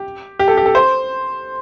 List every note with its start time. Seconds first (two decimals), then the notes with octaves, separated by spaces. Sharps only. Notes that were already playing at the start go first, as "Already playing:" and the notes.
Already playing: G4
0.39 G4
0.48 A4
0.57 G4
0.66 A4
0.75 C5